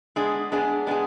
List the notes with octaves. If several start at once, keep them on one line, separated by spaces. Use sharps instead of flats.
G#3 B3 D4 G#4
G#3 B3 D4 G#4
G#3 B3 D4 G#4